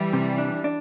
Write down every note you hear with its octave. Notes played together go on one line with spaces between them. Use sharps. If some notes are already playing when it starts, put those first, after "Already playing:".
Already playing: E3 G3
C3
D4
D4